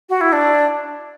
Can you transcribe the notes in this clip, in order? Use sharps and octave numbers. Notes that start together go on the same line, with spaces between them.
F#4
E4
D4